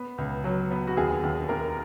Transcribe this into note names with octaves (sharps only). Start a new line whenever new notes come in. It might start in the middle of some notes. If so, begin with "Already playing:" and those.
Already playing: B3
C#2
F#3
B3
F#4
D#2 G#4
D#2
D#2 A#4